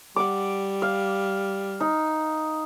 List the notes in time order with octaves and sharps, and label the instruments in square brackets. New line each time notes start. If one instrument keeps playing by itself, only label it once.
[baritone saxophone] G3 [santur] F#5 D6
[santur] F5
D#4